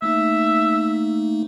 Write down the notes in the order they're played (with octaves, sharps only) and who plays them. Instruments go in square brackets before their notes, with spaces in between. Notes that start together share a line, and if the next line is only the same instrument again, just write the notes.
[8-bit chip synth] A3 A#3 D#4 [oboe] E5